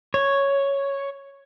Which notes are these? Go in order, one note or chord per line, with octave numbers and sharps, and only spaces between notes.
C#5